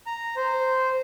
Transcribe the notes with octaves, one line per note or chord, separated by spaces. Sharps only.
A#5
C5